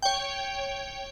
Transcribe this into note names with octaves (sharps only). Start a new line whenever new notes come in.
C#5 G5